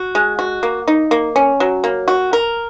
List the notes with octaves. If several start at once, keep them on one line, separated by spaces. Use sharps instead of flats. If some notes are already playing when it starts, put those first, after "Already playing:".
Already playing: F#4
G#3
F#4
A#3
D#4
A#3
C#4
F#3
A#3
F#4
A#4